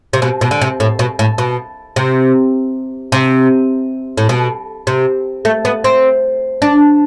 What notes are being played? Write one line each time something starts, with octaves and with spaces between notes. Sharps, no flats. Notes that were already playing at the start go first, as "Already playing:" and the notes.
C3
B2
B2
D3
C3
A2
B2
A2
B2
C3
C3
A2
B2
C3
A3
B3
C4
D4